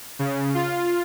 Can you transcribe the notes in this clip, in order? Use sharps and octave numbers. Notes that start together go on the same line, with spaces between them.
C#3
F4